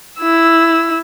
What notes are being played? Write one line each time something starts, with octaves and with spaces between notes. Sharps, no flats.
E4 E6